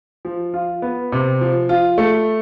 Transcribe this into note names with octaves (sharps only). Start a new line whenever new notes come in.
F3
F4
B3
C3
F3
F4
A3